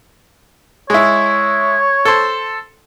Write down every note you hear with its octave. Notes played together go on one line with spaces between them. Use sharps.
G#3 E4 C#5
A4 C5